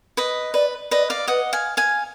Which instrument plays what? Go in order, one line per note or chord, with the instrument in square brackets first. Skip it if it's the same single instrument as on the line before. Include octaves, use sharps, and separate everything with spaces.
[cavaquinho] B4 D#5
[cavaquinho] B4 [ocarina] D5
[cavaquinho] B4 D#5 [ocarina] D5
[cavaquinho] D5 F5
[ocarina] B4 [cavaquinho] D#5 F#5
[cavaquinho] F5 G#5
F5 G#5